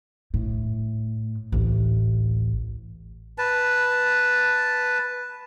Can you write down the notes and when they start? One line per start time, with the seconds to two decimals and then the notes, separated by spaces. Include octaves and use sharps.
0.34 A2
1.52 A1 D2
3.38 B4 A5